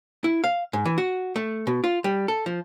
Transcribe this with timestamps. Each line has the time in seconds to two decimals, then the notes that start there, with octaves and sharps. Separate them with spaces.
0.24 E4
0.44 F5
0.73 G#2
0.85 E3
0.98 F#4
1.36 A3
1.67 B2
1.84 F4
2.04 G3
2.28 A4
2.46 F3